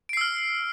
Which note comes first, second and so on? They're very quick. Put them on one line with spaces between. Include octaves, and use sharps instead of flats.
D7 C7 E6 F6